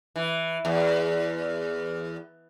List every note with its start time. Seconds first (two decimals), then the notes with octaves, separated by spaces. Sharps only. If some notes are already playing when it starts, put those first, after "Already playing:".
0.16 E3
0.65 E2